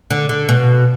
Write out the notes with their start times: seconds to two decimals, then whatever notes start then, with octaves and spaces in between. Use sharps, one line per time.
0.10 D3
0.29 D3
0.49 B2